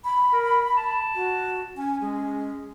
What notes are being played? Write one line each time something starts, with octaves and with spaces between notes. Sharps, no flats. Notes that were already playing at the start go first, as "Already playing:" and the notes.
B5
A#4
A5
F#4
C#4 G#5
G#3